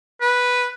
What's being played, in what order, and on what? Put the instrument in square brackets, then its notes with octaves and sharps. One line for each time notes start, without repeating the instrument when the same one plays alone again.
[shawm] B4